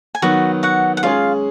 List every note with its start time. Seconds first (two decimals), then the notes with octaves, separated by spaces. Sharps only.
0.15 G#5
0.22 D#3 F#3 B3 F#4 F#5
0.63 F#4 F#5
0.97 F#5
1.03 G#3 C#4 F4 G#4 F5